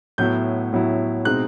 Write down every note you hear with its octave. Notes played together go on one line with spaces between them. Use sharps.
A2 F#3 B3 E4 G6
A2 F#3 B3 E4
B2 G#3 C4 D#4 F#6